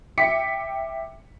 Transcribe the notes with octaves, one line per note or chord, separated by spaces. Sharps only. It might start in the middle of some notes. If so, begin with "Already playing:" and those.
E5 G5 D6 B6 C#7